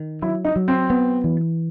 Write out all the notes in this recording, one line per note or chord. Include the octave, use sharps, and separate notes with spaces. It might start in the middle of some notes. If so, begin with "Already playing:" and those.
Already playing: D#3
F#3 E4
D#4
F#3
C4
B3
E3